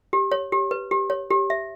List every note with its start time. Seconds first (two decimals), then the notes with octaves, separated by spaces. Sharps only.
0.13 G4
0.32 C#5
0.52 G4
0.71 B4
0.91 G4
1.10 C#5
1.30 G4
1.50 E5